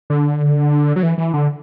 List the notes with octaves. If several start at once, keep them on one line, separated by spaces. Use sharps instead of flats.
D3
F#3
E3
E3
D3